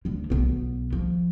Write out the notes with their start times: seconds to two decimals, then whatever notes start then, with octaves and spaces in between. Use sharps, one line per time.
0.05 D2 D3
0.30 B1 B3
0.93 F3